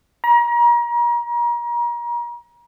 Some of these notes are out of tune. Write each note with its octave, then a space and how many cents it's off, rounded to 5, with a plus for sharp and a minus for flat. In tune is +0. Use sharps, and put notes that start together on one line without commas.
A#5 +35